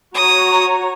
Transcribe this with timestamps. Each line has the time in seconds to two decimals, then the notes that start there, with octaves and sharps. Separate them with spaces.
0.15 F#4 C#5 A#5 D#6